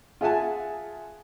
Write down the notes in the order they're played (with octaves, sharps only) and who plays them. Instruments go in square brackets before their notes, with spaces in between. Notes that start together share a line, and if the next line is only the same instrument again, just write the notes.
[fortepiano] F4 G#4 E5 F#5 G#5 A5